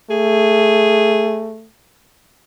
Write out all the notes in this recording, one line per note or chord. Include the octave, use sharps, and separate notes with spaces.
A3 G#4